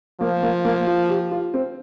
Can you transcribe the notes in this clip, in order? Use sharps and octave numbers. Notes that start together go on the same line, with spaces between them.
F3 A#3
A#3
A#3
F4
G4
F4
C4